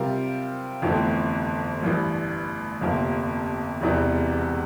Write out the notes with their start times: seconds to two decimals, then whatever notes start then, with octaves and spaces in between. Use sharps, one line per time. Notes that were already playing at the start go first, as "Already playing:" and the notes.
Already playing: C3 G3 C4 F4 A#4
0.82 G1 F2 E3 A3 C4
1.82 A1 G2 E3
2.81 G1 F2 C3 F3 A#3
3.81 E1 E2 C3 E3